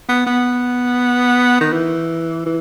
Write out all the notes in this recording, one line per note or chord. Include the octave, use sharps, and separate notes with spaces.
B3
B3
D#3
E3
E3